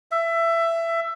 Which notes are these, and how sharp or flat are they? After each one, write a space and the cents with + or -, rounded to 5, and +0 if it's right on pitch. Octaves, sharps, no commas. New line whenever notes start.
E5 +20